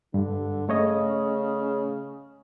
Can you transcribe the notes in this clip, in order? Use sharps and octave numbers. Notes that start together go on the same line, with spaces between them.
G2 D3
C#3 A3 C#5 D#5